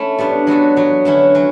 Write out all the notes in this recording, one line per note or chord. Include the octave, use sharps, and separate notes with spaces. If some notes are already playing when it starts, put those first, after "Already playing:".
Already playing: A3 C#4 E4
G3 B3 D4
F#3 B3 F#4 A4
F#3 B3 F#4
D3 F#3 C#4 E4
F#3 C#4